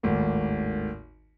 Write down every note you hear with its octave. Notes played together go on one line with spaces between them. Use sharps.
G#1 D#2 A2 A#3